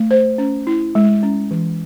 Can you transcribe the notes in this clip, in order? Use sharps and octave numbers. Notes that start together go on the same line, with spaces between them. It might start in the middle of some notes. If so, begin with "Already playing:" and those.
Already playing: A3
C5
C#4
E4
G#3
C#4
E3